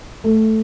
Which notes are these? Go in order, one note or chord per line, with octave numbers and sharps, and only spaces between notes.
A3